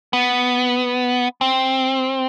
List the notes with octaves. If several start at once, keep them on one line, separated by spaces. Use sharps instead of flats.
B3
C4